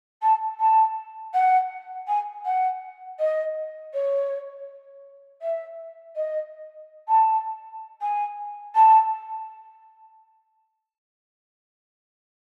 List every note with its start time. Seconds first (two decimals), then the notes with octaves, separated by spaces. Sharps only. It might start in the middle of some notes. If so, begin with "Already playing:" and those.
0.22 A5
0.59 A5
1.33 F#5
2.08 G#5
2.45 F#5
3.19 D#5
3.93 C#5
5.41 E5
6.16 D#5
7.08 A5
8.01 G#5
8.75 A5